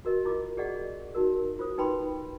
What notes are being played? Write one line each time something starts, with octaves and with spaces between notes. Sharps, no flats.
F#4 A#4 D#5
E4 F4 D6
G4 G#4 D5 D#5 F#5
D#4 F#4 A#4
F4 C5 D#6
D#4 B4 G5 B5 C6